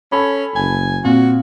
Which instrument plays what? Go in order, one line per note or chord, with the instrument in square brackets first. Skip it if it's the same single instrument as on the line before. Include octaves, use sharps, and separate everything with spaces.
[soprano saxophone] C#4 [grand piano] A4 B5
[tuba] F#1 [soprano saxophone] G#5
[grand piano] A#2 [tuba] C4 [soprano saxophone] F#4